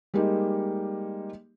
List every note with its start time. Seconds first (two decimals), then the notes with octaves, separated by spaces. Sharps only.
0.14 G3 G#3 A#3 D#4 G4